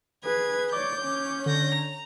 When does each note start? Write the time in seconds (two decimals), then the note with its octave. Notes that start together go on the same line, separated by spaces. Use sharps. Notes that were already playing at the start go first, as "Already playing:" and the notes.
0.24 G#4 B4 G#6
0.73 C#5 D5 D6 G6
1.02 C#4 C#5
1.46 D3 G6 A#6
1.74 A#5